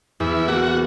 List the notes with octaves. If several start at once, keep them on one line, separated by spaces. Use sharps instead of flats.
E2 E4
A#3 F#4